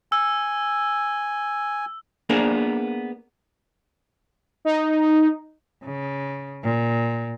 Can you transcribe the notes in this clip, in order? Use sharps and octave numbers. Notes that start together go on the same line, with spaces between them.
G#5 E6
A#3 B3 D4 G#4 A#4
D#4
C#3
A#2